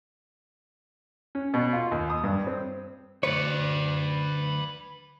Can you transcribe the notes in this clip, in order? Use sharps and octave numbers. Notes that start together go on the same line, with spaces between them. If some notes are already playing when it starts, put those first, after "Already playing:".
C#4
B2
F4
D#2
D#6
G2
C4
D2 B4 C#5 D5